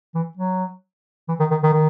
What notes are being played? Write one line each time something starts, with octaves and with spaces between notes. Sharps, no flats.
E3
F#3
E3
D#3
D#3
D#3
D#3